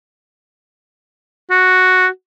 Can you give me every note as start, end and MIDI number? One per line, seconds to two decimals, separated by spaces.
1.50 2.08 66